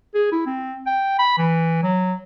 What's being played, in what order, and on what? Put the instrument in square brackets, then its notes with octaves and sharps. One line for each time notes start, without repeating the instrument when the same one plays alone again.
[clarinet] G#4
E4
C4
G5
B5
E3
F#3